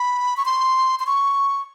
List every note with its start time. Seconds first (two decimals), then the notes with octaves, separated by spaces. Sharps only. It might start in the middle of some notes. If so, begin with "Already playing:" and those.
Already playing: B5
0.37 C#6
0.45 C6
1.00 C6
1.07 C#6